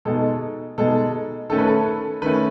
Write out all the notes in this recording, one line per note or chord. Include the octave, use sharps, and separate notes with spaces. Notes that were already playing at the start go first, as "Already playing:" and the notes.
B2 G#3 D#4 A4
B2 G#3 D#4 A4
D#3 A3 C#4 A4
B4
A4
D#3 A3 C#4 B4